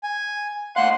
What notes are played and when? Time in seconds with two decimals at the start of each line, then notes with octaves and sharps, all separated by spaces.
0.03 G#5
0.76 D#2 A3 F5 F#5 C6 F#6